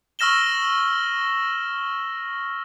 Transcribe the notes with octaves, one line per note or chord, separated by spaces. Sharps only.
C#6 E6 F6 A#6 E7 G7